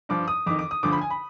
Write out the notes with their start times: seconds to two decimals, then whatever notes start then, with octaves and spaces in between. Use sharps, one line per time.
0.09 G2 F3 D6
0.28 D#6
0.46 F2 D6
0.50 D#3
0.59 D6
0.71 D#6
0.83 D2 D3 F3 D6
0.92 B5
1.01 G#5
1.10 B5